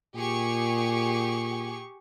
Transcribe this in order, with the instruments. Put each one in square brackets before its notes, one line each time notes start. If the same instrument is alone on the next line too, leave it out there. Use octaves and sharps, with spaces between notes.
[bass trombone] A#2 [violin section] G4 G#4 C#6